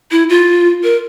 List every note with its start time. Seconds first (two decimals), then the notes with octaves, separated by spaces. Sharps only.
0.11 E4
0.29 F4
0.83 A#4